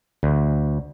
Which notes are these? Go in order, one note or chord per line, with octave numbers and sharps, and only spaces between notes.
D2